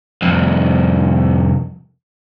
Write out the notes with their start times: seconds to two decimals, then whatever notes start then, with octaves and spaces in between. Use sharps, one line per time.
0.22 C2 F2